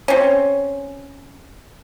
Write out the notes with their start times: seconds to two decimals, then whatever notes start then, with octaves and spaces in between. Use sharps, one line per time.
0.08 C4 C#4